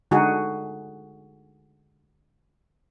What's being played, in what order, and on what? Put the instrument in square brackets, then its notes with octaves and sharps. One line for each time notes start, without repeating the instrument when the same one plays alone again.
[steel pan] D3 G#3 D#4 F#4 G#4